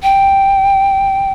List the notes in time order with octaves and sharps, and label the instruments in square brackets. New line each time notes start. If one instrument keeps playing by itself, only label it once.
[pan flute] G5